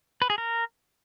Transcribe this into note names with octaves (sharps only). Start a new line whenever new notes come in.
B4
G#4
A#4